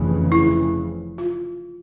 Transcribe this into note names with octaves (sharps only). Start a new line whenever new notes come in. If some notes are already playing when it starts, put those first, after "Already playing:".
Already playing: F1 F2 C#3 E3
E4
F4